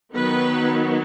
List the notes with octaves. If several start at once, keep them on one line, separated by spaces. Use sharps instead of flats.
D#3 F#3 B3 B4